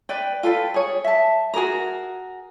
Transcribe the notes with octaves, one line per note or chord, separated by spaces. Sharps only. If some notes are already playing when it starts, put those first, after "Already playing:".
B4 D5 G5
F4 A4 B4 G5
G#4 C#5
E5 A5
F#4 G#4 A#4 A#5